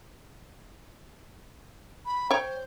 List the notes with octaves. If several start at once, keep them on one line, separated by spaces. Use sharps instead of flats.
B5
C5 C#5 G5